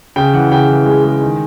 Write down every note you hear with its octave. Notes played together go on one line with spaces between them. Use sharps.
C#3 G5
E3 F#5
C#3 G5
E3
G#3
G#3
D#3